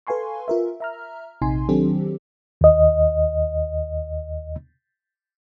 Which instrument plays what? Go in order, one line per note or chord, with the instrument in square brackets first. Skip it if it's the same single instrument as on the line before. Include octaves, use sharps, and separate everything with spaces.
[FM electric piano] A4 B4 F5 G#5 C6 C#6
F4 A#4 E5
E5 A#5 F6
A#1 C3 D#4 G#5 C6
D#3 F#3 C4 D4 G4 A4
[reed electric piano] D#2 D#5